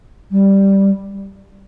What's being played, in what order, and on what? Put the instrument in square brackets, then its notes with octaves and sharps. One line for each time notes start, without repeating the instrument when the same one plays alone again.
[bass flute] G3